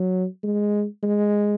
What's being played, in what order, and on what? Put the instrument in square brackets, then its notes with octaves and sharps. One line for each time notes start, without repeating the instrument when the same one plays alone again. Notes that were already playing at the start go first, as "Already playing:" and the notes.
Already playing: [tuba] F#3
G#3
G#3